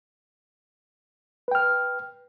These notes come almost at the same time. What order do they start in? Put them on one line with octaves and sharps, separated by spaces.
B4 G5 F6